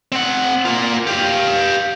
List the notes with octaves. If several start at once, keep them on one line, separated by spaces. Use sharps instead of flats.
C4 F#5
A#3 F4
G4 F5